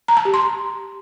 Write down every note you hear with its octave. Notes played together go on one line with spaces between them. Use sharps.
A#5
A5
G4
C6